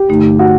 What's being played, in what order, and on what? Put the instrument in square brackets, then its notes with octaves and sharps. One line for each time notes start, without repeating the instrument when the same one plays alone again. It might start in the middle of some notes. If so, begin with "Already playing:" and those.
Already playing: [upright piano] G4
[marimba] G2 D3 A3 D#4
[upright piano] F#4